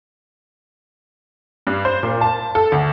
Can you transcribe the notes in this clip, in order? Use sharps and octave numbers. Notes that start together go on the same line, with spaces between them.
G2
C5
A#2
A5
A4
D2